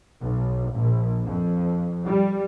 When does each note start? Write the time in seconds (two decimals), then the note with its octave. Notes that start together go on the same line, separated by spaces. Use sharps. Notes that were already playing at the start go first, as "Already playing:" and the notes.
0.21 B1
0.74 A#1
1.25 F2
2.05 G3